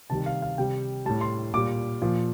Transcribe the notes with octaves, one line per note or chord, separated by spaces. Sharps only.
C3 D#3 G3 A5
F5
F5
C3 G3 G5
A2 G3 A5
C6
A#2 G3 D6
A#2 F3